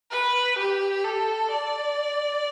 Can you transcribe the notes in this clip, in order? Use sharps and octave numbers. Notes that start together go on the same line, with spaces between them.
B4
G4
A4
D5